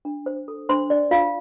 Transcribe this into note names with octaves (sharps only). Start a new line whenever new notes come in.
D4
C5
A4
D4 C5 C6
D4 D5
F4 C5 F5